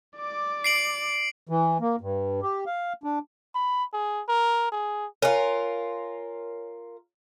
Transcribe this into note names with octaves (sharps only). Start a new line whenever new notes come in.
D5 D6
C7 D7 F#7
E3
A#3
G2
G4
F5
D4
B5
G#4
A#4
G#4
F4 A#4 C#5 G#5